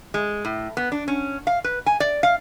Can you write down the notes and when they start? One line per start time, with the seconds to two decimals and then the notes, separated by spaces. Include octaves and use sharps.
0.14 G#3
0.45 A2
0.77 B3
0.92 D4
1.08 C#4
1.47 F5
1.64 B4
1.86 G#5
2.00 D5
2.23 F5